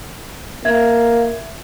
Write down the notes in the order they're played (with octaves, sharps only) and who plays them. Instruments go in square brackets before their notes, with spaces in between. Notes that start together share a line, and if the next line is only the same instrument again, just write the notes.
[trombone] A#3 [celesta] E5 G#6